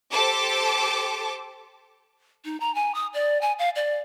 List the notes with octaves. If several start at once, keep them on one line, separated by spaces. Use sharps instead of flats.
G4 A4 C5 A5 D6
D#4
A#5
G#5
D#6
D5
G#5
F5
D5